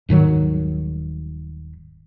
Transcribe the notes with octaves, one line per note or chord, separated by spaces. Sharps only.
D#1 G#2 D#3 F#3